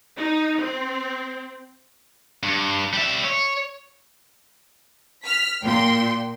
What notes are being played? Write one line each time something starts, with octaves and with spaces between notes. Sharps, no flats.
D#4
C4
G2
G3 E5
C#5
F6 B6
A#2 G5 C6